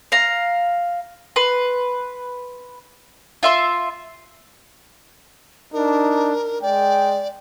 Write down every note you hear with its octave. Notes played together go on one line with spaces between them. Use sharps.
F5 A#5
B4 C6
F4 E5 C6
D4 D#4 A#4
G#3 D5 G5